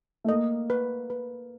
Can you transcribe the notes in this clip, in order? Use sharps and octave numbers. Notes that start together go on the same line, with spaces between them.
A3
A#3 D#5
B4
B4